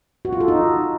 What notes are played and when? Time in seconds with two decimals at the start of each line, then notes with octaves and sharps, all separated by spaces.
0.25 F#4
0.33 F4
0.40 A4
0.48 D#4